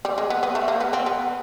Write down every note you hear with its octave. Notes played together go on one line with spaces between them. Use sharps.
G3
G#3
B3
B3
A3
A#3
B3
C4
B3